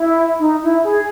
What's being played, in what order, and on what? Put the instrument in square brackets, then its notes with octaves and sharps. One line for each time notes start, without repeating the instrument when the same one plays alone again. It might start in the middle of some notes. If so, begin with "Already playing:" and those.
Already playing: [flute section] E4
D#4
E4
G#4